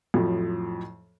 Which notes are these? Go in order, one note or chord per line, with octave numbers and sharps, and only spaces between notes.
F2 A2 F3 F#3